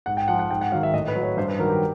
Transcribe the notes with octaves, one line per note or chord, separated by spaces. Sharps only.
G#2 F#5
G5
F3 F#5
F#5
G#2 G5
F#5
D#3 F#3 F5
E5
A2 D#5
B4
F#3
C#5
G2 C5
B4
D#3 F#3 A#4
G4